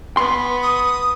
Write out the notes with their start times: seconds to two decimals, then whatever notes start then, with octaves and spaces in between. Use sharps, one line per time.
0.17 B3 C6
0.63 D#6